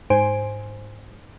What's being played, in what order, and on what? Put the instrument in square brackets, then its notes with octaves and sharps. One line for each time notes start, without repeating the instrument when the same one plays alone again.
[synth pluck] G#2 C5 G#5 D7